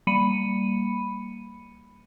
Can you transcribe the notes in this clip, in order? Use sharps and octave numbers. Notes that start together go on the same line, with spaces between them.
G3 A#3 B5 C#7 D#7